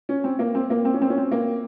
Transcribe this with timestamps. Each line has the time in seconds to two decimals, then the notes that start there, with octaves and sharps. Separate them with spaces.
0.09 C#4
0.24 C4
0.39 A#3
0.55 C4
0.70 A#3
0.85 C4
0.94 C#4
1.02 C4
1.10 C#4
1.18 C4
1.31 A#3